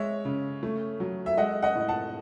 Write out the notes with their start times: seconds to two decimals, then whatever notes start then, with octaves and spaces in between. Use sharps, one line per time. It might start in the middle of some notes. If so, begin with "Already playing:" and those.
Already playing: G#3 C#5 E5
0.25 C#3
0.63 A3
1.00 F#3
1.26 E5
1.37 G#3 D#5 F#5
1.62 D#5 F#5
1.75 A2
1.89 F#5 A5